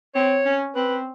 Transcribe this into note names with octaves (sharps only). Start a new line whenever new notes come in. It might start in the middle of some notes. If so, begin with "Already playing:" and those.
C4 C#5
C#4
C4 B4